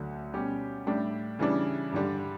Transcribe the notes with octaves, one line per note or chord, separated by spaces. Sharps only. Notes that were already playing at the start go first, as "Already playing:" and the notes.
Already playing: D2 D3 F#3
B2 G3 C#4 G4
A2 G3 D4 G4
C#3 E3 G3 D4
G2 D3 G3 D4